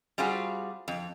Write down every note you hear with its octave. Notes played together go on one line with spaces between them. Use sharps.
G3 C4 F4 F#4 G#4
F2